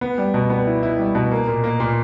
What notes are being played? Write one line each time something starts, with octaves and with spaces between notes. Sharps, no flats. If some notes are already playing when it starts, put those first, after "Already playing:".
B3
G3
B2
B3
E4
E4
G3
B2
A#3
A#2
A#3
A#2